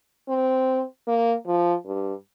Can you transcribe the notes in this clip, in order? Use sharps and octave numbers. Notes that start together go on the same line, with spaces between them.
C4
A#3
F3
G2